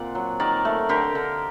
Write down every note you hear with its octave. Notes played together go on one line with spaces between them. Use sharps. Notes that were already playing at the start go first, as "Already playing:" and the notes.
Already playing: A#2 C4 D5 F#5
F#3
D#3 A#4 D5
A3
D3 G4 A#4
D3